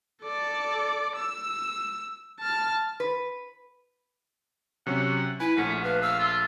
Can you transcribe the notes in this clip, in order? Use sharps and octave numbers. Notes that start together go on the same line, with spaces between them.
A4 D5
E6
A5 F6
B4
C3 F#3 C#4 F#5
E4 B4 G#5
A#1 A3 C#4 F#5 B6
B4 F5
F5 E6
F4